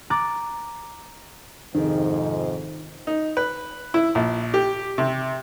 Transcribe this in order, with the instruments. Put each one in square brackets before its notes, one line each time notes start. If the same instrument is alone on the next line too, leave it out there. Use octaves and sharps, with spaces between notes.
[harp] A#5 D6 F#6 A6
[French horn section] F2 G#2 C3 [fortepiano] D#3
[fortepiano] D#4
B4
E4
A#1
G4
C3